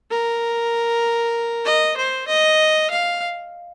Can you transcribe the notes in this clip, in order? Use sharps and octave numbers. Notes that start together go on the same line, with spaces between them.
A#4
D#5
C5
D#5
F5